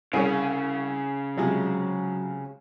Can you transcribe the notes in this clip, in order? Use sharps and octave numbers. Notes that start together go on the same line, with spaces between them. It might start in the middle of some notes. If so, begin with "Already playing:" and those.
C2 C#3 G#4 C#5
C3 F3 F#3 G#3